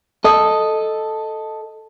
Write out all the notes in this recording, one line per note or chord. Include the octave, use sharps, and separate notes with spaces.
A4 D#5